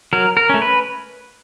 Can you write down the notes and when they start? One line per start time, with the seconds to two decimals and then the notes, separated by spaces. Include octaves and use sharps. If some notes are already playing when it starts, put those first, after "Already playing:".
0.13 F#3 A#4
0.37 A#4
0.49 A3 C#4
0.62 B4